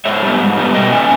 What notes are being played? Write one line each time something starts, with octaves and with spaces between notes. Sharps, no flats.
G#2 C#5 E5
G3 B3
G#2
G3 B3
B2 D#5 G5
A#3 C#4 E5 G#5